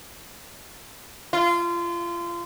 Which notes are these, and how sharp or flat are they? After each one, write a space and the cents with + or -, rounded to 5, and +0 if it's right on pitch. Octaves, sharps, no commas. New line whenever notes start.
F4 -25